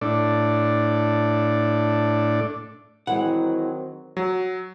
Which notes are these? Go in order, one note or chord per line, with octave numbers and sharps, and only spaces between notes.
A2 D4
D#3 E3 F#3 G#3 C4 F#5
F#3